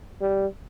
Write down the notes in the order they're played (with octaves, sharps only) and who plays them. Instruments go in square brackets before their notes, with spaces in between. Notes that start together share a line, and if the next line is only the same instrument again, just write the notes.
[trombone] G3